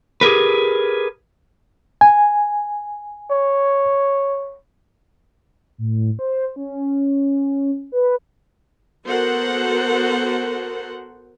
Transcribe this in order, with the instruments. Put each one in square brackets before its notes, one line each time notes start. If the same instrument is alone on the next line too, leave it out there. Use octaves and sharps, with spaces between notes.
[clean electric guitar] G4 G#4 A#4 B4
[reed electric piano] G#5
[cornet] C#5
[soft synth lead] A2
C5
C#4
B4
[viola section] B3 F#4 A4 A#4 C5 F#5